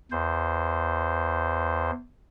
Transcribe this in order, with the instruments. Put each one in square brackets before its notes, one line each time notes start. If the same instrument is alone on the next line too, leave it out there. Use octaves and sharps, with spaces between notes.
[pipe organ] E2 C5